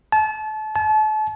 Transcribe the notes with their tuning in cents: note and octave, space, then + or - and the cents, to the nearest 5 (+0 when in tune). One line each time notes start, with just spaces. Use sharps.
A5 -30
A5 -35